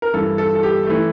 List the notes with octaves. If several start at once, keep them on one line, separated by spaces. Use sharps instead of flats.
A#4
G2 E3 A4
A4
A4
G4
E3 A3